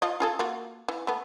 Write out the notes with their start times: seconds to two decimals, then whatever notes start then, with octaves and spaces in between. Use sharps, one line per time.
0.02 F3 F4 D#5
0.20 F4 G#4 A4
0.39 A#3 F4 F#4
0.88 E3
1.07 A3 B3